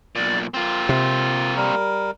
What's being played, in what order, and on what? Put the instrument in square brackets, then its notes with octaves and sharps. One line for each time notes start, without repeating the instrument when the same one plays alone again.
[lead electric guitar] B1 A#2 [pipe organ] D5
[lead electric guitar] A#3 C4 [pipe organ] F4
[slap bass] C3
[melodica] G3 A#4